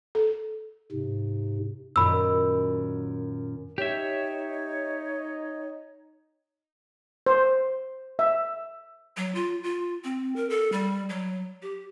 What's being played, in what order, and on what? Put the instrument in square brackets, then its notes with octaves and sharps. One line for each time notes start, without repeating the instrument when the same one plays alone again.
[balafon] A4
[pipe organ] G#2 C3
[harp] F#2 A#2 D#3 [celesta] B5 E6
[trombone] D#4 [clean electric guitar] G4 E5 [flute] C#5
[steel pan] C5
E5
[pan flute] F#3
F4
F4
C4
A#4
A4
G3
F#3
G4